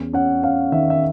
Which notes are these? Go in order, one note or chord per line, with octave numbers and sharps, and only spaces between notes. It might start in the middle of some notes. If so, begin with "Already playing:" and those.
Already playing: E2 C#4
C#4 F#5
C#4 F5
D#3 E5
E5